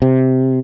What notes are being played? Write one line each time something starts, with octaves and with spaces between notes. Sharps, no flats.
C3